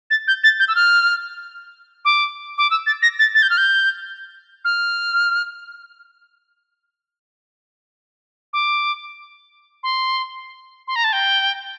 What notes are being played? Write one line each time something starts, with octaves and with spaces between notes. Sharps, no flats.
A6
G6
A6
G6
E6
F6
D6
D6
E6
A6
A#6
A6
A6
G6
F6
G6
F6
D6
C6
C6
A#5
A5
G5